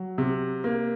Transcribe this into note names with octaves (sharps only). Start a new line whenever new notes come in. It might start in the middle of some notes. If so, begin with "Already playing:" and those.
Already playing: F#3
C3
A#3